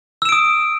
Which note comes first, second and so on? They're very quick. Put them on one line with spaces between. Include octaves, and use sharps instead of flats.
E6 E7 D7 D#6